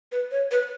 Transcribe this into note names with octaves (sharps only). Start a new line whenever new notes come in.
B4
C#5
B4